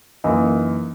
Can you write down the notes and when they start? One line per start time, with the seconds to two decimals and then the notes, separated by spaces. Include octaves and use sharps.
0.24 F#2 E3 A#3 D#4